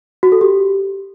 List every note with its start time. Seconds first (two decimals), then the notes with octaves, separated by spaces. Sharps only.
0.23 F#4
0.32 A4
0.41 G4